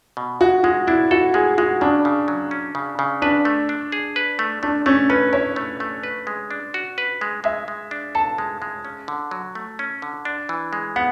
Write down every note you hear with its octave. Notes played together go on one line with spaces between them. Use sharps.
B2
G#3 F#4
G#3 F#4
D4 E4
F#4 A4
G#3 G#4
G#3 F#4
C#3 D4
C#3
F#3
C#4
C#3
C#3
D4 B4
A3
D4
G#4
B4
A3
A3 D4
A3 C#4
C#4 B4
E4 C#5
A3
A3
B4
G#3
D4
F#4
B4
G#3
G#3 E5
G#3
D4
A4 A5
G#3
G#3
C#4
D3
F#3
A3
C#4
D3
D4
E3
G#3
B3 F#5